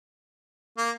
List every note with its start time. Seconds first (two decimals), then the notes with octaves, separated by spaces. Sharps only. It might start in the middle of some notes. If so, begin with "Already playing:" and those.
0.78 A#3